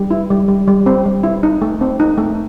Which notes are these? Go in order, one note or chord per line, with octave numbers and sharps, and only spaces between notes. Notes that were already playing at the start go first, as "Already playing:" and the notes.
Already playing: G3
E4
G3
G3
G3
C4
G3
E4
D#4
A3
C4
D#4
A3